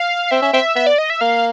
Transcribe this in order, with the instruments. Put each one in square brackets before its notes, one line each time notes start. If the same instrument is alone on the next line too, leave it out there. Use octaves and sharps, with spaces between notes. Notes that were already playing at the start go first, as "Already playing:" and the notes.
Already playing: [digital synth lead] F5
[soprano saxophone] C4 [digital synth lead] E5
[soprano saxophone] C#4
[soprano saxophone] C4 [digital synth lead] E5
[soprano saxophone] B3 [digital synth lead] E5
[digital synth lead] D5
D#5
E5
[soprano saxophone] A#3 [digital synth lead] F5